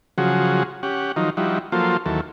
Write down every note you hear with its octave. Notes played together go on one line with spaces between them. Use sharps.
C#3 F3 F#3 F#4 G#4
C#4 G4 F#5
D#3 F3 F#3 D#4
F3 G3 D#4 E4 F#4
F3 F#3 A#3 F4 A4 C5
D#2 E3 F#3 A4